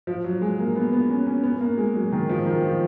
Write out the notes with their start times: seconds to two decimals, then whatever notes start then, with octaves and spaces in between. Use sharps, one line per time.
0.07 F3
0.24 F#3
0.41 G#3
0.59 A#3
0.76 B3
0.93 B3
1.10 C#4
1.27 C#4
1.43 B3
1.61 A#3
1.78 G#3
1.95 F#3
2.12 D#3
2.29 F3
2.46 D#3
2.64 F3